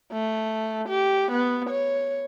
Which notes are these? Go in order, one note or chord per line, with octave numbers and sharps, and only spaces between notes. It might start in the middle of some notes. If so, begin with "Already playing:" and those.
A3
G4
B3
C#5